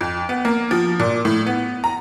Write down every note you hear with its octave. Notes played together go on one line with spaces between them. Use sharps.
F2
B3
A#3
F3
A#2
A2
B3
A#5